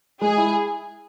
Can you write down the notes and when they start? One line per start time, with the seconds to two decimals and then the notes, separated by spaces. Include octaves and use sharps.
0.21 G#3 G#4
0.37 E4